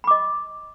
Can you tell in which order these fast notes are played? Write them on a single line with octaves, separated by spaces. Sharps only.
B5 D6 D#5